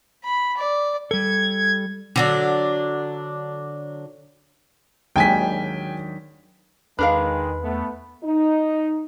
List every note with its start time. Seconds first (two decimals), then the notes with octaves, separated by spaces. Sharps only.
0.24 B5
0.57 D5
1.11 G3 A4 G#6
2.16 D3 F#3 D4
5.16 D#2 G#2 D#3 F#3 D4 G5 G#5 B6
6.99 E2 D#3 G#3 D4 A#4 B4 F5 B5
7.63 A3 B3
8.24 D#4